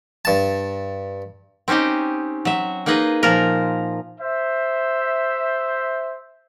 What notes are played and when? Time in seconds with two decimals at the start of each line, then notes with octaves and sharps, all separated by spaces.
0.25 G2 A5
1.68 C4 C#4 D#4 G4 D#5
2.45 F#3 E5
2.86 A#3 D#4 G#4 B4 D#5
3.23 A#2 F3 F4 A#4
4.20 C5 E5